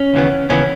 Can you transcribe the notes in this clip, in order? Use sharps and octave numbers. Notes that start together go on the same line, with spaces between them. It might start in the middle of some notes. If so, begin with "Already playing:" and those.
Already playing: C#4
D#2 C#3 E3 B3
D#2 C#3 E3 B3 C#4